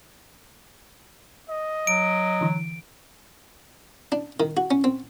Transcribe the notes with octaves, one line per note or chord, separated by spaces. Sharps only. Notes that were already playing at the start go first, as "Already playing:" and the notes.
D#5
F#3 D7
D3 E3
D4
D#3
F#4
C#4
C4